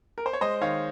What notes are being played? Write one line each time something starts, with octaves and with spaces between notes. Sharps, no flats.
A#4
C5
C#5
G#3 C5 D#5
D#3 C#5 F5